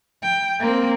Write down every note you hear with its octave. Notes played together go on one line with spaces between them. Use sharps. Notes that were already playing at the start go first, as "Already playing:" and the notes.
G5
A#3 C4